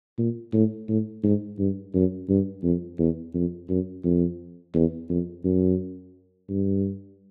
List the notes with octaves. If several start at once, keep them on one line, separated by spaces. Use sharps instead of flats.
A#2
A2
A2
G#2
G2
F#2
G2
F2
E2
F2
F#2
F2
E2
F2
F#2
G2